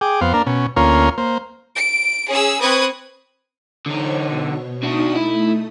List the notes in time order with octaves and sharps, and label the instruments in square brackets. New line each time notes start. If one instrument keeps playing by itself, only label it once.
[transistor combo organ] G#4 G5 D6
F2 B3 C5 F5
A#3 D4 A#4
B2 C#4
D2 A#3 C#4 F4 A#4 C#5
A#3 C5
[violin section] D7
C#4 G#4 E6
C4 B4 C#6 D#6 G#6
[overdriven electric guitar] D3 D#4 [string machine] C5 C#5 C#6
[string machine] B2
[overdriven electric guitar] D4 F#4 [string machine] D#4 D#6
[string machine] A3 [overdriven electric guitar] E4